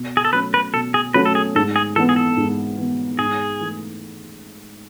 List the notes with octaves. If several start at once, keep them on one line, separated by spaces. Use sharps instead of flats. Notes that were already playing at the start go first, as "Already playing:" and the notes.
Already playing: B2
G#4
A4
F#3 A3 C#4 B4
B4
B2 A4
G#4
F#3 A3 C#4 B4
A4
G#4
G#2 A4
G#4
E3 B3 A4
G#4
A4
G#2
E3 B3
G#2 G#4
E3 A3